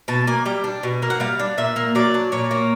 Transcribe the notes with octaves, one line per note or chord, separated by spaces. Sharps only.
B2 A5
A#3 G#5
G3 G5
D4
B2
A#3
F#5
G3 F5
D4
A#2 E5
A#3
F#3 D5
D4
A#2 C#5
A#3